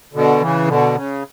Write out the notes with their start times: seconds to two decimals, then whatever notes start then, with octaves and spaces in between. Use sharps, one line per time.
0.14 B2 D3
0.40 C#3 E3
0.68 B2 D3
0.95 C#3